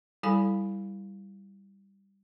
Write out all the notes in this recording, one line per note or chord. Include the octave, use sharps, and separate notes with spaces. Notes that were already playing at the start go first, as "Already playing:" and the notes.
G3 E4 A4 F5 G#5 B5